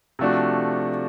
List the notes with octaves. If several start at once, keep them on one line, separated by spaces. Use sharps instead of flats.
C3 F3 A3 D4 F#4